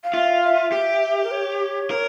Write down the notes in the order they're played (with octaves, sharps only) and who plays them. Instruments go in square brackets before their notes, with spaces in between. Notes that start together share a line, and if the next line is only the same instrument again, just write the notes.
[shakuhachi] F5
[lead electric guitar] F4 [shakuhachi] E5
[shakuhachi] E5
[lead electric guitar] G4
[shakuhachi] A#4
C#5
[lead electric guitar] A#4